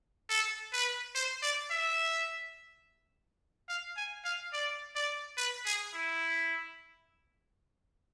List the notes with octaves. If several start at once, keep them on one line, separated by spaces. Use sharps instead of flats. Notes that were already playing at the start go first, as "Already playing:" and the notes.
A4
B4
C5
D5
E5
F5
G#5
F5
D5
D5
B4
G#4
E4